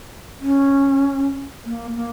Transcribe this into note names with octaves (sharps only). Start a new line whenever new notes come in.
C#4
A#3
A#3